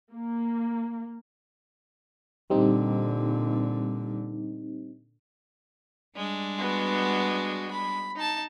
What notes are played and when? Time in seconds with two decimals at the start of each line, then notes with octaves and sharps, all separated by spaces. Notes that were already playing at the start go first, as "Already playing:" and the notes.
0.13 A#3
2.50 A#2 D3 G3 C4 D#4
6.15 G3 G#3 D4
6.59 B3 F#4
7.71 B5
8.16 D#4 A5